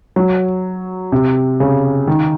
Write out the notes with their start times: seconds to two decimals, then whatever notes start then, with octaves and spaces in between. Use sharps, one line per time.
0.16 F#3
1.12 C3
1.60 C#3
2.07 D#3